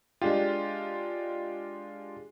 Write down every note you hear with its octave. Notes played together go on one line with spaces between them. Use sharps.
G#3 D4 F4 G4